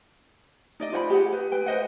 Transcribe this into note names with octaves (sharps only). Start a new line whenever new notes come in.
D#4 D5 D#5
F4 C5 F#5 B5
G4 G#4 F#5
B4
B4 G5
B4 C5 D#5 F#5